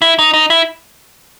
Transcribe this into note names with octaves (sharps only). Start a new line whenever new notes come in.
E4
D#4
D#4
E4